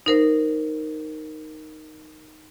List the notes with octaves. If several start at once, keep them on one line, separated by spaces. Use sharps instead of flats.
D#4 A#4 C5